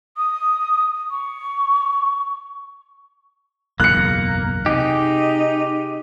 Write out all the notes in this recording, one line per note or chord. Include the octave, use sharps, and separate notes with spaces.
D#6
C#6
F#1 B1 E2 A#3 F#6 C#7
C3 D#4 G4 G#4